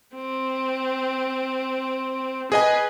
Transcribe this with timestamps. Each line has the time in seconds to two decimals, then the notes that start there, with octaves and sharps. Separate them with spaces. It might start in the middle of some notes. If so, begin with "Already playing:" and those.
0.15 C4
2.52 G#4 B4 D#5 G#5